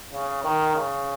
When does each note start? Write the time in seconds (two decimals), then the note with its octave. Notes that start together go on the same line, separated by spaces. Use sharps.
0.13 C#3
0.44 D#3
0.76 C#3